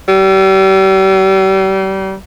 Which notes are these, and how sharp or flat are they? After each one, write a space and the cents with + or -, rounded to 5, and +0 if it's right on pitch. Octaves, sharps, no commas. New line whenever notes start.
G3 -35